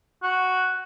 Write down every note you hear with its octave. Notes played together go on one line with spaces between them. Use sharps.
F#4